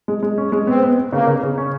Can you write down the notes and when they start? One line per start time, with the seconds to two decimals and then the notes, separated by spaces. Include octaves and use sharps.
0.08 G#3
0.23 G#3
0.38 C#4
0.52 G#3
0.67 B3 C4
0.83 B3
0.98 B3
1.13 C#3 A#3
1.27 C#3
1.43 C#3
1.58 C#4